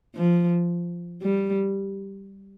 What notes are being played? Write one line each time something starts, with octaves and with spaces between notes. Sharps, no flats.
F3
G3